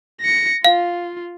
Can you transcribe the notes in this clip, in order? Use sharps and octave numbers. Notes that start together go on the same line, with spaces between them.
A#6 C#7
F4 F5